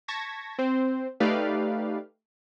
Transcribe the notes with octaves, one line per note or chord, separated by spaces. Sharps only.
A5 C#6 G#6 A#6 B6
C4 C5
A3 D#4 G4 B4 D5 F5